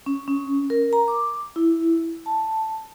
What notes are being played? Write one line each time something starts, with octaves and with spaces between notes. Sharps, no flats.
C#4
C#4
A#4
A#5
D6
E4
A5